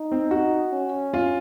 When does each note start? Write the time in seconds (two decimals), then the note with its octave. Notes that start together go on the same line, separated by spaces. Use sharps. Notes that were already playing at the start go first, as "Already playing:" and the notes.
Already playing: D#4
0.12 C4
0.31 F#4
0.72 C#4
1.14 F4